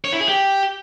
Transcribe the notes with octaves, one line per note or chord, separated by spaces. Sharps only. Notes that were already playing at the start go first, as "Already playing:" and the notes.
C#5
E4
G#4
G4